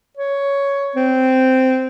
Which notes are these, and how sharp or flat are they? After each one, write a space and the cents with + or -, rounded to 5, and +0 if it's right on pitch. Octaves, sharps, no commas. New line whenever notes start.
C#5 +10
C4 -10